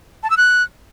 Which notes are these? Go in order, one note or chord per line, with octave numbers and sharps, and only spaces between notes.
A5
E6
F#6